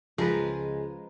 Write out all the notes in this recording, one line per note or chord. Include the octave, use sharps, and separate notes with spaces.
C#2 F3 G#3 G#4 A#4 B4